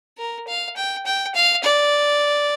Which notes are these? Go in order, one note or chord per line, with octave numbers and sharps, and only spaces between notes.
A#4
F5
G5
G5
F5
D5